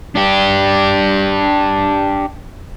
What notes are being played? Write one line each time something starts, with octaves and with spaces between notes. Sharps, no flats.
D4 G4